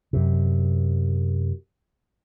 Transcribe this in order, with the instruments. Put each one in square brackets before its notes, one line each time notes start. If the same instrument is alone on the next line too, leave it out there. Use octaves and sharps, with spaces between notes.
[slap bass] F#2 C3